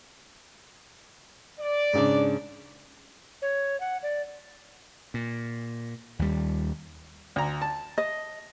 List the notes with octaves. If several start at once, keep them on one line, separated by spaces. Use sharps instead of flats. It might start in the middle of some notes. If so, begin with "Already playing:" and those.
D5
G#2 C#3 D4
C#5
F#5
D5
A#2
D#2 G3
D2 A#5
A5
D#5